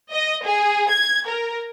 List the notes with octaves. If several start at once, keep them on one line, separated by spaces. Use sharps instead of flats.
D#5
G#4
G#6
A#4